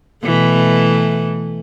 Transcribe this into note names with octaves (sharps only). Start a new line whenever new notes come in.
B2 E3 A3